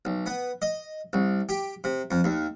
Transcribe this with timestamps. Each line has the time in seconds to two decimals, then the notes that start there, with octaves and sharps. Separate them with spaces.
0.05 B1
0.26 B3
0.62 D#5
1.13 C2
1.49 G4
1.84 C3
2.11 F2
2.24 D#2